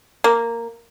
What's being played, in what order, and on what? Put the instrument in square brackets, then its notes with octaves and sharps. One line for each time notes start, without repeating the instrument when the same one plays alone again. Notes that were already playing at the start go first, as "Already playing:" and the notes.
[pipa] A#3